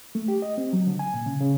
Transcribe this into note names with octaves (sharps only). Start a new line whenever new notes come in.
A3
G4
D#5
C4
F#3
D3
G#5
A#2
C#3
C#3